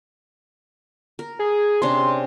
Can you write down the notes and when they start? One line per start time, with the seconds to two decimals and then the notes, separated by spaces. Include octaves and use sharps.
1.19 A#4
1.39 G#4
1.82 C3 C#4 D4 C6